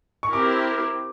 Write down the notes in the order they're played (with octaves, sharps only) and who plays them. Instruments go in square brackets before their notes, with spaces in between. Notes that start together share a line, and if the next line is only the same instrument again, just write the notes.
[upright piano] C#6
[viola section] C4 E4 G4 A#4 [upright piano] D6